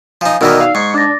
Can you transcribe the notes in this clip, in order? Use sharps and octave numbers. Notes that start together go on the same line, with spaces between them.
F3 D#4 F5 G#5
B2 D#3 E3 D#4 A#4 D5 E6
F5
G#2 C#6 C7
D4 D6 A6 A#6